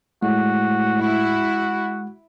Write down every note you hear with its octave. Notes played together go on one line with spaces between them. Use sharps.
A2 G#3 F#4
E4 F#4